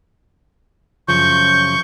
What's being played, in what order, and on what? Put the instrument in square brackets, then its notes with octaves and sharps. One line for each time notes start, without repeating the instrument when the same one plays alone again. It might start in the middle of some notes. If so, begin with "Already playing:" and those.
[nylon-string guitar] F#2 C#3 F3 [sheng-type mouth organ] C#6 G6